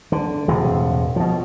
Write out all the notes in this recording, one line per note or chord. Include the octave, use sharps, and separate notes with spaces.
D3
E1 A2 C3
B2 F3